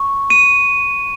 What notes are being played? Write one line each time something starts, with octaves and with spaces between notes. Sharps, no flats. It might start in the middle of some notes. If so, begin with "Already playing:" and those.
Already playing: C#6
D#7